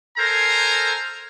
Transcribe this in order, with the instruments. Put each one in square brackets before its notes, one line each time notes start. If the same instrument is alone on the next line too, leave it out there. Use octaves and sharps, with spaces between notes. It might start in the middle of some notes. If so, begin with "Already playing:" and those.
[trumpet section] A4 A#4 C5 G#5 A#5